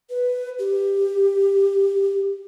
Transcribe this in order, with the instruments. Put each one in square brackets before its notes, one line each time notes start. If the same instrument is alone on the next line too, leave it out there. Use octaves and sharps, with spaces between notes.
[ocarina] B4
G4